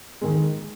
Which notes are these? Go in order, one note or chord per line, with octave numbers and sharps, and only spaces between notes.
D#3 G#3